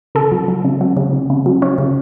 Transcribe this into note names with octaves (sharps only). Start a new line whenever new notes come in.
C#3 A4
F#3
F#3
C#3
F#3
C#3
C#3
C#3
F#3
C#4
C#3